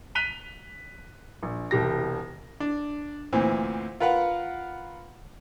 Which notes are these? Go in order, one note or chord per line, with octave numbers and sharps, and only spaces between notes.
F#6 B6 D#7 F7 G7
A#1
E1 C2 G4 A#6
D4
D2 A#2 E3 C4
F4 A#4 B4 F5 F#5